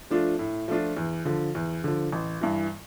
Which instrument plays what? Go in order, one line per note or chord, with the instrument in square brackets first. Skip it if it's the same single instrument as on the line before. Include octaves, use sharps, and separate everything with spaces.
[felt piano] F3 A3 D4 F4
A2
F3 A3 D4 F4
E2
D3 F3
E2
D3 F3
A1
G2 E3